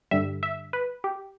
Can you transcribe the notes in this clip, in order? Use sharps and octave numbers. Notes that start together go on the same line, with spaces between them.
G2 D3 G3 E5
E5
B4
G4